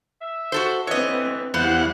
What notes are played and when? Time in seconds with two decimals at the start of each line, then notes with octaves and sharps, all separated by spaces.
0.20 E5
0.52 F#4 A4 C5
0.87 D3 E3 B3 C4 B4 C#5 D#5
1.54 E2 G3 B3 E4 C5 F5 F#5